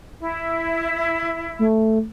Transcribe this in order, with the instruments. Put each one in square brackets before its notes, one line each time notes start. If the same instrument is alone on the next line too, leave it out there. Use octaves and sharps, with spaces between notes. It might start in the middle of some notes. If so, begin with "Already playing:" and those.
[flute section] E4
[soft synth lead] A3